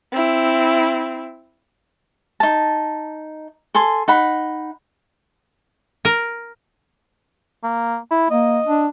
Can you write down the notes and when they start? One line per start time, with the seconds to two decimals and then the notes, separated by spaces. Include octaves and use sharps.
0.12 C4 E4
2.40 D#4 A5
3.75 A4 G#5 C6
4.08 D#4 F#5 B5
6.05 A#4
7.63 A#3
8.11 E4
8.30 A#3 D#5
8.66 D4